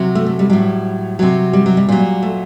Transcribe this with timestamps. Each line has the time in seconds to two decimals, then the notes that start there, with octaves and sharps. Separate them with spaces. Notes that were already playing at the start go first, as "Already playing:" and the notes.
Already playing: C3 F#3
0.15 A3
0.26 A3
0.39 G3
0.50 A2 F#3 G3
1.19 C3 F#3
1.53 G3
1.66 F#3
1.77 G3
1.89 A#2 F#3
2.23 A3